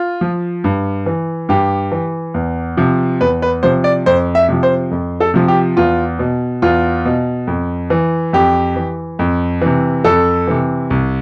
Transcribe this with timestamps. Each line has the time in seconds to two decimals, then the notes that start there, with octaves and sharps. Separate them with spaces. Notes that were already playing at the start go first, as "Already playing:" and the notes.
Already playing: F4
0.21 F3
0.64 G2
1.06 E3
1.49 G2 G4
1.92 E3
2.34 E2
2.77 C3 F3
3.21 E2 B4
3.42 B4
3.63 C3 F3 C5
3.84 D5
4.06 F2 C5
4.35 E5
4.49 C3 F3
4.63 C5
4.91 F2
5.20 A4
5.34 C3 F3
5.48 G4
5.77 E2 F4
6.19 B2
6.62 E2 F4
7.05 B2
7.47 F2
7.90 E3
8.33 F2 G4
8.76 E3
9.19 F2
9.61 C3 E3
10.04 F2 A4
10.47 C3 E3
10.90 C2